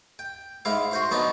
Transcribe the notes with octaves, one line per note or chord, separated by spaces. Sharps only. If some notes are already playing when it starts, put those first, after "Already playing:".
G5
G#2 E4 F5
F#4 C5 C6
F#3 B3 D4 D#4